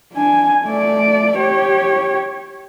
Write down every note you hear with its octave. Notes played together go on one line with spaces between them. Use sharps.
D4 G#5
A3 D5
G4 C#5